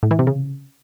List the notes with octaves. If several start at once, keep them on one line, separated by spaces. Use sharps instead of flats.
A2
E3
C3
C#3